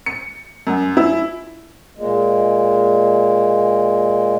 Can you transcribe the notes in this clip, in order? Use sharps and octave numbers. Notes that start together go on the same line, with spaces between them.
C#7
F#2
E4
A#2 G#3